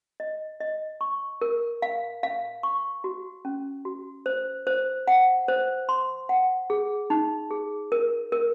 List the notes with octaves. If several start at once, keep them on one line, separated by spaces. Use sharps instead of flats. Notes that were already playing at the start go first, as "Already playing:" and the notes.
D#5
D#5
C#6
A#4
F5
F5
C#6
F#4
C#4
F#4
C5
C5
F#5
C5
C6
F#5
G#4
D#4
G#4
A#4
A#4